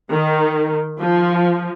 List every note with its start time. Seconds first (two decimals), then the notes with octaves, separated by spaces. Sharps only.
0.11 D#3
1.01 F3